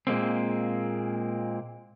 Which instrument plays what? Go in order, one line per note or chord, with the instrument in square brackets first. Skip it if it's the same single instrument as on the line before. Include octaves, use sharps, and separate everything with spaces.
[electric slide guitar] A#2 G#3 A#3 C4